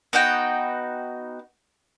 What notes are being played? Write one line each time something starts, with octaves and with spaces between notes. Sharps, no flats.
B3 D#4 F#4 G5